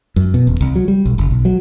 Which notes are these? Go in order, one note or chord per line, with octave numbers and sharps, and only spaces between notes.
F#2
B2
D#1
C2
F#3
G3
B1
F#1
B1
F#3